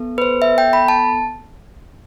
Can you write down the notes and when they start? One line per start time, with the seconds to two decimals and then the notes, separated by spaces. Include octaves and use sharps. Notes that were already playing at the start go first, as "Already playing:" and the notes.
Already playing: B3 A4
0.18 B4
0.22 C5
0.42 E5
0.58 G5
0.73 B5
0.88 A5